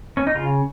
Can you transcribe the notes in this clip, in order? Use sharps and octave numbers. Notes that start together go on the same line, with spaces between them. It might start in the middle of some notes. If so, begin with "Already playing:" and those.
C#4
D#4
C#3 F4